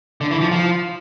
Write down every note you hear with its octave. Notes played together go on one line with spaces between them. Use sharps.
D3
E3
F3
F3